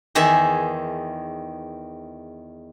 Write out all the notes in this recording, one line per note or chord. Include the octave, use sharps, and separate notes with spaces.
E2 D#3 G#4 E5